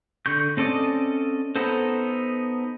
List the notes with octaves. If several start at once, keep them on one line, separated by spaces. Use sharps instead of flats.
D3 C#6 G6
C4 C#4 A4 D5 D#5
B3 D#4 A4 C5